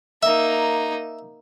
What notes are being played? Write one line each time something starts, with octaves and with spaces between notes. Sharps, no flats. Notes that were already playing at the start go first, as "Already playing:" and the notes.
A#3 D#4 E5